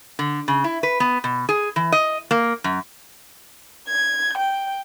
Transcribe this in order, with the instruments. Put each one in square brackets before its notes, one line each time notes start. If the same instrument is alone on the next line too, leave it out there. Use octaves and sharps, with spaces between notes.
[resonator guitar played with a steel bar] D3
C#3
E4
B4
B3
B2
G#4
E3
D#5
A#3
F#2
[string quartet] G#6
G5